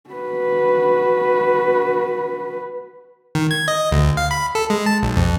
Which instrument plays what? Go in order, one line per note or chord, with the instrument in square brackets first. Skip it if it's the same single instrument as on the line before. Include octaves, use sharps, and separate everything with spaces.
[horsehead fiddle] F#4 B4
[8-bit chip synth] D#3
G#6
D#5
D2
F5
B5
A4
G#3
A5
B1
F2